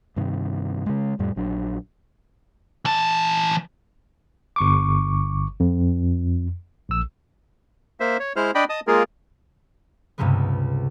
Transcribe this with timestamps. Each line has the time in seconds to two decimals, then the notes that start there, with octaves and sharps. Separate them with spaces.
0.16 G2 C3 D#3
0.86 C#3 G#3
1.19 F2 A2 G3
1.36 A#1 F#3 D4
2.85 E3 A5
4.56 G1 C#6 D6
5.60 F2
6.89 A#1 E6
8.00 A#3 C5 E5
8.20 C#5
8.36 G#3 E4 C5 F6
8.55 D4 D5 D#5 G5 B5
8.69 D#5 A5 D#6
8.87 G#3 A#3 F4 G#4 A#4
10.18 C#2 G2 C3 G3 G#3 B3